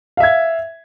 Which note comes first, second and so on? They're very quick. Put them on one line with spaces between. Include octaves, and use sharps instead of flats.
F5 E5 G#6